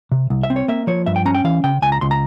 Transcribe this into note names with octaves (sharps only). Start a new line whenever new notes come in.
C3
C2
E5
C4
C#5
A#3 E5
F3 C#5
G2 E5
G5
C#4 A#5
G5
E3 F5
C#3 G5
C#2 G#5
A#5
C#2 C6
A#5